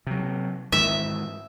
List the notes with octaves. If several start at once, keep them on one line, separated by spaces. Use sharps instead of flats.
C3 F#3
G#2 D#3 E3 E5